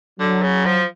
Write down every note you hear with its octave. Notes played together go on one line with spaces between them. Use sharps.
D3 F#3
C#3
F3